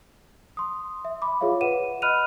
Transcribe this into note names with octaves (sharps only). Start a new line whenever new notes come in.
C6 D#6
E5
B5 D6
F4 G#4 C#5 E5 F5
B4 F#5 D#7 E7
D#5 B5 F6 F#6 D#7 F7